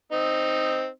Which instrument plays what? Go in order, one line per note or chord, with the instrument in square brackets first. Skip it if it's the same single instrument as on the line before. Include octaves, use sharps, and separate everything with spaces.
[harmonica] C4 D#4